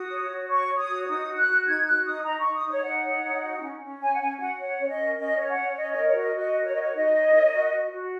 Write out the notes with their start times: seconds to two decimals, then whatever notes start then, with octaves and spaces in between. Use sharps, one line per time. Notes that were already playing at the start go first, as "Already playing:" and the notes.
Already playing: F#4 D#6
0.10 C#5
0.29 F#4
0.49 C#5 C#6
0.68 C#5
0.77 D#6
0.88 F#4
1.07 D#4 D#6
1.27 F#4
1.36 F#6
1.46 F#4
1.66 D#4 G#6
1.85 F#4 F#6
2.05 D#4 D#6
2.24 D#4 A#5
2.40 D#4 C#6
2.54 D#6
2.63 D#4
2.69 C#5
2.83 D#4 F#5
3.03 C#5
3.23 D#4
3.42 F#4
3.61 C#4
3.81 C#4
4.01 C#5 G#5
4.13 F#5
4.20 C#4 G#5
4.39 F#4 F#5
4.59 C#5 F#5
4.79 C#4 C#5
4.88 D#5
4.99 A#4
5.18 C#4 D#5
5.38 C#5
5.47 F#5
5.57 C#4
5.76 C#5 D#5
5.91 D#5
5.96 A#4
6.06 C#5
6.16 F#4
6.21 D#5
6.35 F#4 D#5
6.55 A#4
6.65 C#5
6.73 F#4 D#5
6.80 C#5
6.94 D#4 D#5
7.14 C#5
7.33 A#4
7.53 F#4
7.72 F#4
7.92 F#4